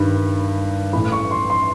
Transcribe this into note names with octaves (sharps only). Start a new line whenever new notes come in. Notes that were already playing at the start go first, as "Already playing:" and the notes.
Already playing: G2 D#3 B5
A2 E3 B5
C#6
C6
C6